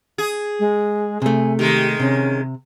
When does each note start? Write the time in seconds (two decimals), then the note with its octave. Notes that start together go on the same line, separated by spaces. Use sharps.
0.18 G#4
0.60 G#3
1.22 C3 A3 G#5
1.59 D#3 G#3 G4
2.00 C3 C#4